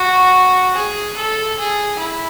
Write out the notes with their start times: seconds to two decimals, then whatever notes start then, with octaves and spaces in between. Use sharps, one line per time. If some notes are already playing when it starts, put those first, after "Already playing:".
Already playing: F#4
0.75 G#4
1.17 A4
1.59 G#4
1.99 E4